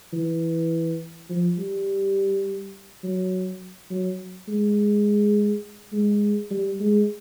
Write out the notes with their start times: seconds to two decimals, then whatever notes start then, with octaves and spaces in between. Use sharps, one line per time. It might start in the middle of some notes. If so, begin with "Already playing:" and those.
0.13 E3
1.30 F3
1.58 G3
3.04 F#3
3.91 F#3
4.49 G#3
5.93 G#3
6.51 G3
6.80 G#3